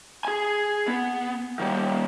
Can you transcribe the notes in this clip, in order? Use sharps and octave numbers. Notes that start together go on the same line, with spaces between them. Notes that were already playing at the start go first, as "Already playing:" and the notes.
G#4 G#5
B3
D#3 G3